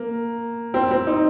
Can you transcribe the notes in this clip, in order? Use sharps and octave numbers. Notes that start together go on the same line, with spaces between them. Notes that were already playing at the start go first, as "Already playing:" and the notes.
Already playing: A#3
C4
C4
D#4